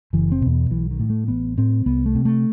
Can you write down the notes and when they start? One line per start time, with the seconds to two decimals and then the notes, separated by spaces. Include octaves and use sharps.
0.13 F#1 E3
0.32 C4
0.41 E2 B2
0.52 B3
0.71 B1 E3
0.91 D#3
1.00 A2
1.10 A3
1.28 A1 B3
1.57 A2 C4
1.86 C2 B3
2.06 A3
2.15 C3
2.25 A3